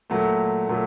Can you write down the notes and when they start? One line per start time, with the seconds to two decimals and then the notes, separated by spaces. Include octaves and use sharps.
0.10 A#2 F#3 A3
0.69 A#2 F#3 A3